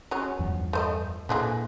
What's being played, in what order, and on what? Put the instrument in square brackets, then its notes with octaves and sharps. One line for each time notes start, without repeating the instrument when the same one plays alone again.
[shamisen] F#3 G#3 C#4
[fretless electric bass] E2 G2 F3
[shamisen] A3 C5 D#5
[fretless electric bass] A#2 [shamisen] D3 E3 G#3